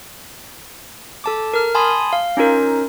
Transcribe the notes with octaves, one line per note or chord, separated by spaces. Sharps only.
A4 A5 D6
A#4 F6
G#5 A5 B5 C6 D#6
F5
C#4 D#4 F4 A#4